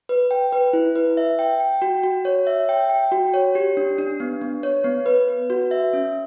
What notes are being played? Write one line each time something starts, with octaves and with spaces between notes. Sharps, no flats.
B4
G5
B4
E4
B4
E5
G5
G5
F#4
F#4
C#5
E5
G5
G5
F#4
C#5
G4
D4
D4
B3
B3
C#5
B3
B4
B4
F#4
E5
C#4